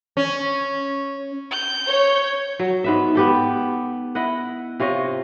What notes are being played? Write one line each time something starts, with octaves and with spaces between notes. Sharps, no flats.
C#4
G6
C#5
F#3
G#2 B3 E5
B3 G4 A4
E4 D#5 F#5
C3 F4 C#5 D#5